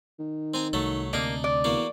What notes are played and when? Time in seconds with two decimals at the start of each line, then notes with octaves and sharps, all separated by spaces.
0.19 D#3
0.54 C4 G#5 A#5
0.73 C2 F#3 A3 A4
1.13 D2 C3 A#3 D4 D#4 D#5
1.44 D5
1.64 E2 A#3 F#4 F5